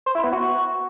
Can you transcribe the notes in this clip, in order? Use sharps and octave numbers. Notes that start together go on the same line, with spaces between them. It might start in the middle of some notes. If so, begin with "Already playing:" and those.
C5
E4
B3
F#4